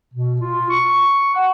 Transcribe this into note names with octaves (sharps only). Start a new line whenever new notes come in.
B2
F4
C#6
F#5